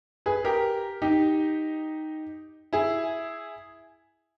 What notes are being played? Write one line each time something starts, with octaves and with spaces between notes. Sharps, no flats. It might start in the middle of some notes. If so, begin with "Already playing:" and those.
G#4 B4
G4 A#4
D#4 G4
E4 G#4